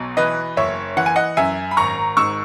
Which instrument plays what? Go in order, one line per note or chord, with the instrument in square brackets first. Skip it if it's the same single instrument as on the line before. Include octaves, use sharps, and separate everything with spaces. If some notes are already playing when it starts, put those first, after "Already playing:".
Already playing: [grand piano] B1 B2
E3 B4 D#5
F#1 C#5 E5
E3 F#5
G#5
D#5 F#5
F#2 E5 G#5
B5
G#1 A#5 C#6
G#2 C#6 E6